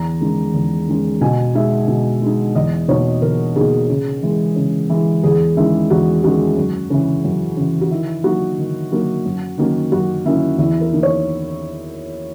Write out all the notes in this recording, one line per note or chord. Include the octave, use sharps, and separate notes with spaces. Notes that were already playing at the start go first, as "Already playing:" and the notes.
Already playing: E2 A#5
D#3 G#3 C#4
E2
D#3 G#3 C#4
B2 G#5
G#3 D#4 E5
B2
G#3 D#4
E2 D#5
B2 A#3 D#4 C#5
E2 A#4
B2 A#3 D#4 G#4
C#3
E3 G#3
C#3
E3 G#3
E2 G#4
D#3 G#3 C#4 E4
E2 F#4
D#3 G#3 C#4 F#4
F#2
C#3 E3
F#2
C#3 E3
F#4
D#3 E4
F#3 A#3 D#4 F#4
D#3
F#3 A#3 D#4
F#2
D#3 F#3 A#3 C#4
F#2 F#4
D#3 F#3 A#3 C#4 E4
E2 E4
A#4
D#3 A#3 D#4
C#5